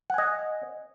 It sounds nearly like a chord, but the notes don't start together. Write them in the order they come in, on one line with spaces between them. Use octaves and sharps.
F#5 G#5 D#5